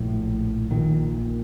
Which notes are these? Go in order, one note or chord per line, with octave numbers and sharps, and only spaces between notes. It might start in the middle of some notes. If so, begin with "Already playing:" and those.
Already playing: A#1 A2
A#1 A#2 D#3